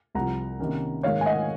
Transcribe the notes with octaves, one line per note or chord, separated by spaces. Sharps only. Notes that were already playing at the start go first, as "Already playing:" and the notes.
C2 C3 F3 F#5 A#5
C3 D#3 A#3 C#4
G#2 D#3 A#3 C#5 F5
G#5
D#5 F#5